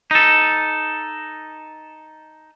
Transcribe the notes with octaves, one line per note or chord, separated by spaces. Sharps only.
D#4 A4